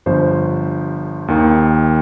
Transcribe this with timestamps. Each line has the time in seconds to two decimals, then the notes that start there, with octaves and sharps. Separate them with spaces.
0.06 G1 G2 F3 C5
1.28 D#2 D#3